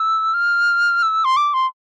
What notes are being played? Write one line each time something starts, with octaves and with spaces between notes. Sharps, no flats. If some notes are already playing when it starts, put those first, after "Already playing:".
Already playing: E6
F6
E6
C6
D6
C6